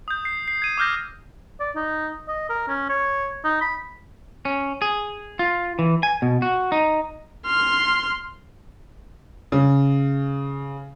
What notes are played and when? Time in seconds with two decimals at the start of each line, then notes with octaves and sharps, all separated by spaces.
0.08 D#6 G6
0.25 C7
0.48 C7
0.62 G#6 D#7
0.78 D6 E6 F6 G6 A#6
1.60 D5
1.75 D#4
2.28 D#5
2.49 A#4
2.68 C#4
2.89 C#5
3.44 D#4
3.61 B5
4.45 C#4
4.82 G#4
5.39 F4
5.79 E3
6.03 G#5
6.22 B2
6.42 F#4
6.72 D#4
7.47 C6 F6
9.52 C#3